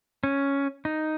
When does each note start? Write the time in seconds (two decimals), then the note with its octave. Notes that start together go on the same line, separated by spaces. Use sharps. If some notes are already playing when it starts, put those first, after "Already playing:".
0.23 C#4
0.85 D#4